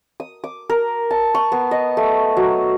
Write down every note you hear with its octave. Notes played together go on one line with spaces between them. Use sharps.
D#6
D6
A#4
A5
C#6
B3
D#5
A3
F#3